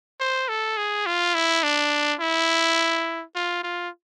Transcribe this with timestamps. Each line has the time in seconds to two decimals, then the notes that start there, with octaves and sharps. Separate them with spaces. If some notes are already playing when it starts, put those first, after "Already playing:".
0.20 C5
0.49 A4
0.77 G#4
1.06 F4
1.35 E4
1.63 D4
2.20 E4
3.35 F4
3.63 F4